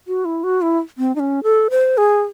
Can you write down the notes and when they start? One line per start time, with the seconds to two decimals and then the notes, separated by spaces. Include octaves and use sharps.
0.08 F#4
0.25 E4
0.44 F#4
0.62 E4
0.98 C4
1.16 D#4
1.20 C#4
1.43 A4
1.70 C5
1.97 G#4